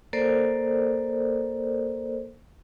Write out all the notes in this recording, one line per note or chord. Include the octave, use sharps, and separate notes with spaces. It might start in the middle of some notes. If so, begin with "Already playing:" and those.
A#3 A4 A#4 C5 D5